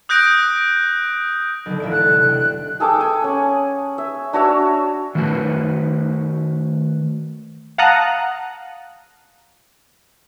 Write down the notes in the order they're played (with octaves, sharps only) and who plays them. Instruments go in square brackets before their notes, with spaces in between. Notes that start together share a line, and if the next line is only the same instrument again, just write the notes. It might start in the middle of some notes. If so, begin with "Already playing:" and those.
[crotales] D#6 F#6 G6 A#6 D7
[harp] B1 D3
E1 E5 D7
[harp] F#5 A5 [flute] F#6
[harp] C3
D4 G5
[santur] G#4 A4 G5 D6
G#5
C#4 F#5
E5
D4 F#4 C#5 E5
[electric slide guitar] D#3 A3 F#4 B4
[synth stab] F5 F#5 A5 A#5 D#6 F#6